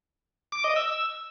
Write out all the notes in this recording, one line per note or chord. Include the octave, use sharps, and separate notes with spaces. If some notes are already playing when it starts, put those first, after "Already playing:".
D6
D#5
E6